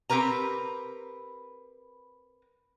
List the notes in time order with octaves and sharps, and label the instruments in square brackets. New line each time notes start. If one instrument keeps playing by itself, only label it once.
[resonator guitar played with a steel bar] C4 G4 A#4 B4 A#5